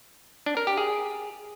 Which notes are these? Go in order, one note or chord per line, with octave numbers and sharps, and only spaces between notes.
D4
A#4
G4
G#4